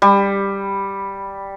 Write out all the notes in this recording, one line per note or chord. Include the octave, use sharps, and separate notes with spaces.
G3